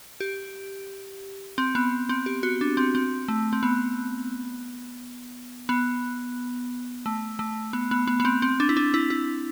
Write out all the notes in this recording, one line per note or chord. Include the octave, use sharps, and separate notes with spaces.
G4
C4
B3
C4
G4
F#4
D4
C4
C4
A3
C4
B3
B3
A3
A3
B3
B3
B3
B3
C4
C4
D4
E4
D4
E4
E4